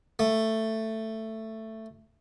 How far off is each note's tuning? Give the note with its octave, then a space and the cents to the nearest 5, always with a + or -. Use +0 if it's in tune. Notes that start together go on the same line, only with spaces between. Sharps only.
A3 +10